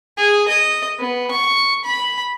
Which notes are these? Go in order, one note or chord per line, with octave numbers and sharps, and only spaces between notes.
G#4
D#5
B3
C#6
B5